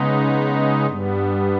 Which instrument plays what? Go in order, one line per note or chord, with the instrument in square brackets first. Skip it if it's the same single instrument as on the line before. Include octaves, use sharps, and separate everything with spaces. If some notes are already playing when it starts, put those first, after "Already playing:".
Already playing: [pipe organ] C#3 G#3 B3 D#4
G2 G3 B3